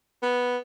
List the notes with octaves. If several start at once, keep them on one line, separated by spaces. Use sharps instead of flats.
B3